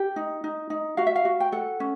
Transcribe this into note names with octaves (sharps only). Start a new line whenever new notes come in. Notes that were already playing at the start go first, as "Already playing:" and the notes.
Already playing: G4
D#4
D#4
D#4
F#4 F5
E5
F5
F#4
G5
A4 F#5
C#4